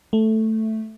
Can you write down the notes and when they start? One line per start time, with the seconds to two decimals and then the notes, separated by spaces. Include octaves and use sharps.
0.13 A3